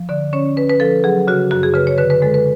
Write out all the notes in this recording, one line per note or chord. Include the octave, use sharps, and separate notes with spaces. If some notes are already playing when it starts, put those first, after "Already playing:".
Already playing: F3
D3 D5
C#4 C#5
C#4 B4
B4
F3 A4
F#3 G#4
C#3 F#4
F#2 F#4
G#4
C#3 B4
C#5
D3 B4
B4
G#3 A4
B4